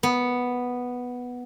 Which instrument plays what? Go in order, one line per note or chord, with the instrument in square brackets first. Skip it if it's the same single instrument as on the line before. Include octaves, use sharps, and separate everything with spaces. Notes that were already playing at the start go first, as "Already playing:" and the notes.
[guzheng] B3